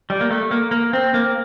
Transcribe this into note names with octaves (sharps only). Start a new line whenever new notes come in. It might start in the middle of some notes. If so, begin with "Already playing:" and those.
G3
A#3
A3
A#3
A#3
C4
A#3